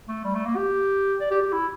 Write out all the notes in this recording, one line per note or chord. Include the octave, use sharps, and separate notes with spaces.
A3
G3
A3
A#3
G4
D5
G4
G4
E4